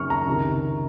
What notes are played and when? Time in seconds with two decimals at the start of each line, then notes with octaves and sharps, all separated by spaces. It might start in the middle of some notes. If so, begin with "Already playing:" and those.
Already playing: F#1 F#2 D#3 C#6 F6
0.10 A#5
0.27 C#2 C3 D#3